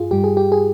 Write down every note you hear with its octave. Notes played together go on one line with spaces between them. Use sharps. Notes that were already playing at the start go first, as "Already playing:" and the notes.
Already playing: G2 F4 G#4
G2 G3 G4
G#4
G4
G#4